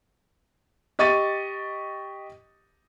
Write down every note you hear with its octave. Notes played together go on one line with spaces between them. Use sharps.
G4 D#5 C#6 A6 D#7